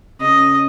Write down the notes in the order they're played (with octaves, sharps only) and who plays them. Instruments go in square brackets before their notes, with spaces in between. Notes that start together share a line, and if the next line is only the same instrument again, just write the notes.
[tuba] C#3 [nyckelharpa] D#5